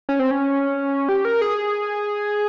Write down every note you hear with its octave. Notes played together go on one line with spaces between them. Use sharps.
C#4
C4
C#4
G4
A#4
G#4